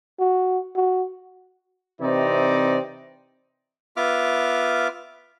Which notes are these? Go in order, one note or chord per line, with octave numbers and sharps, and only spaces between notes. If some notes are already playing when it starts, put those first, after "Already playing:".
F#4
F#4
C3 E3 C4 D#4 D5
B3 F4 E5 D6 F6